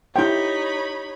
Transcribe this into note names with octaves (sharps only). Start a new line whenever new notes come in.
D#4 E4 G4 C#5 G5 B5 G6